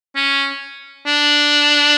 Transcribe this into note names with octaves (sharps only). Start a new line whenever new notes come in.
C#4
D4